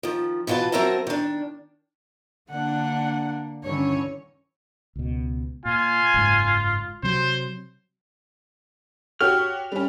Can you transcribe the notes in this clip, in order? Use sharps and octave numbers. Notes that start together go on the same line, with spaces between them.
D#3 F3
B2 E3 F4 B4 A5
F#3 C4 A#4 E5 A5 A#5
D#3 D4
D3 A#3 D4 F#5
G2 D3 D#3 C#4 E4 C#5
C#2 B2
A#2 F4 G#5
F#1 G#2
C3 F#3 C5
F#4 G4 C#5 F6
G3 C#4